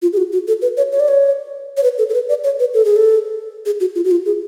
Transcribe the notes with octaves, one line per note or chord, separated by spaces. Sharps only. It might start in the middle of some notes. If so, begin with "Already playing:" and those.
F4
G#4
F#4
F#4
A4
B4
C#5
C#5
D5
C#5
C#5
B4
A4
A4
B4
D5
C#5
B4
A4
G#4
A4
G#4
F#4
F4
F#4
F4
G#4